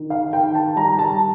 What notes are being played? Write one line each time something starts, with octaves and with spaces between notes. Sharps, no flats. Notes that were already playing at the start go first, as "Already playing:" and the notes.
Already playing: D#3
F5
D#3 G5
A5
G3 A#5
A5